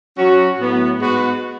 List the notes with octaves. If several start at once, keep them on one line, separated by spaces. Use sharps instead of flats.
F#3 C#4 F#4
A2 F#3 B3 F#4
G#2 G#3 B3 F#4 B4